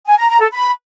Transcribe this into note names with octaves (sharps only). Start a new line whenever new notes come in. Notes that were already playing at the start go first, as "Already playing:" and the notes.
G#5
A#5
A#5
A4
B5